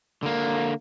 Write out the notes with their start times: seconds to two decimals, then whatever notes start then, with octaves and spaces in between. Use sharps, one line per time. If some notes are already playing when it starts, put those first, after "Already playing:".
0.23 D3 A#3